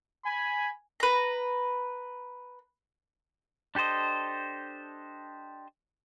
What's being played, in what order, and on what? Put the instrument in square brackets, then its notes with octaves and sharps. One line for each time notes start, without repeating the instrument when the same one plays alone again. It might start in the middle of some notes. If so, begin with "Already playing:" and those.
[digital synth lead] G#5 [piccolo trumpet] B5
[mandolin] B4 A#5
[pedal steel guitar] D4 G4 A4 C5 D#5